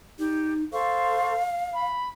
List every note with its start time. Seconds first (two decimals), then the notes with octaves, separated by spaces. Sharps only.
0.19 D#4 G4 D5
0.72 A4 C5 F5 C#6
1.74 B5